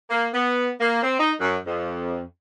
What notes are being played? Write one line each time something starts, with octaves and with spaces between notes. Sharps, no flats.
A#3
B3
A#3
C4
D#4
F#2
F2